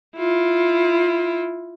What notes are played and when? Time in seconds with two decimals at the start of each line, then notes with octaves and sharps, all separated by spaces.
0.16 E4 F4